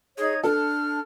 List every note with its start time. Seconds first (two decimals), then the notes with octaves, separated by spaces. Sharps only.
0.18 D#4 G#4 C#5 G#6
0.44 D4 A4 F6